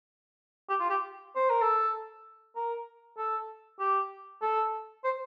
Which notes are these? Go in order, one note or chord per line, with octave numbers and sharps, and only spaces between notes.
G4
F4
G4
C5
A#4
A4
A#4
A4
G4
A4
C5